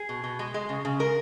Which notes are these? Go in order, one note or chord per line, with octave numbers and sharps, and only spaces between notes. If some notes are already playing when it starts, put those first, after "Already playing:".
Already playing: G#4
B2
B2
G#3
G#3
C#3
C#3
G#3 A#4